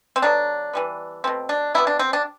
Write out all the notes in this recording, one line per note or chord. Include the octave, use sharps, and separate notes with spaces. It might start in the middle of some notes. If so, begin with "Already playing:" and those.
C4
D3 F#3 B3 D4
E3 G3 B3
B2 A3 C4
D4
C3 G3 B3 E4
D4
C4
D4